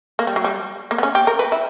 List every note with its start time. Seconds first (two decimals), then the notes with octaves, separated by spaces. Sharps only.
0.19 A#3
0.27 G3
0.36 F#3
0.44 G3
0.91 A#3
0.98 B3
1.03 C#4
1.15 G4
1.27 A#4
1.39 B4
1.52 E4